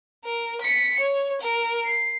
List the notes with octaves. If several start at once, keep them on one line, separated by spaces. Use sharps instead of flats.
A#4
B6 C#7
C#5
A#4
C7